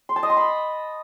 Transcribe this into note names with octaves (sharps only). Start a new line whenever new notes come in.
C6
A5
D#5
C6
B5